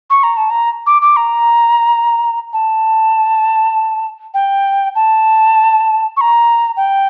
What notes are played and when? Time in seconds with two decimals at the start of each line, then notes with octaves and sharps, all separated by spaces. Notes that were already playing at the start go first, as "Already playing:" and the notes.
0.10 C#6
0.23 A#5
0.37 A5
0.50 A#5
0.87 D6
1.02 D6
1.16 A#5
2.53 A5
4.34 G5
4.95 A5
6.17 C#6
6.21 A#5
6.77 G5